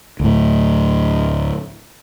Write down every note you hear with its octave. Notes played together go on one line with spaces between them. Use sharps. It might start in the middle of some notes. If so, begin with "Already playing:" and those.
D2 A2